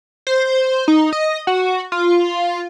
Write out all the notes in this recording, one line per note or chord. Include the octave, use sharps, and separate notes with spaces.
C5
D#4
D#5
F#4
F4